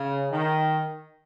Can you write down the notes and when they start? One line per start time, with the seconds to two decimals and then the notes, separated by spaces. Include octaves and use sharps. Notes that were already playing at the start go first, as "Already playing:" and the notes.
Already playing: C#3
0.30 D#3